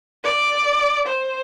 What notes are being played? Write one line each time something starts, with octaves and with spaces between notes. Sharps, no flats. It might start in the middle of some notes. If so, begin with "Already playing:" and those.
D5
C5